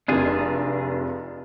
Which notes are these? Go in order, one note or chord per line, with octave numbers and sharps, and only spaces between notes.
F1 C3 D4 F4 G#4